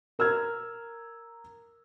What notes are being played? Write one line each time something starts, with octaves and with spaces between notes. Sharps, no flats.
A#4 E6 F6 G#6